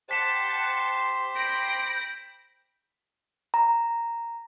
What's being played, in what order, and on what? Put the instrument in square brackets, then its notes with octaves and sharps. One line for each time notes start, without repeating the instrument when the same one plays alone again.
[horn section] G4 C5 [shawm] F#5 [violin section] A5 [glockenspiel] B6 E7
[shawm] G5 [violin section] B5 A#6 D7
[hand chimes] A#5